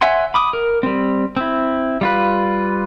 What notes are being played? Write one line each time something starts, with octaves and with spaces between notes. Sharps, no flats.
C#5 E5 F#5 G#5 C6
B5 D6 D#6
A#4
G3 C4
C4 E4
G3 F4 B4